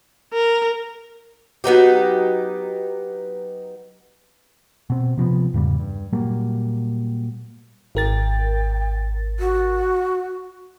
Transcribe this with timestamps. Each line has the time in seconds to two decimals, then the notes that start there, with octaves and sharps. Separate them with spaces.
0.33 A#4
1.64 F#3 B3 D#4 G4
4.90 B2 C4
5.17 C3 F3 A#3 B3
5.54 E2 G#2 C#3 G3
5.80 G2
6.12 A#2 F#3 G3 A#3
7.95 G#1 A#4 G5 A6
9.39 F#4